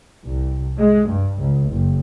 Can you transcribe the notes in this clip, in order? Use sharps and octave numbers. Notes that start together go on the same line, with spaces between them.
C2
G#3
G2
C#2
F#1